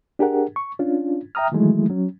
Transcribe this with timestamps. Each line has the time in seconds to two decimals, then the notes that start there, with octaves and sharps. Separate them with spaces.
0.19 D4 G4 G#4 A#4 F#5
0.56 C#6
0.79 C#4 D4 F4
1.35 E5 G5 A#5 D#6 F6
1.52 D#3 E3 F#3 G#3 A3 E4
1.90 F#3 C#4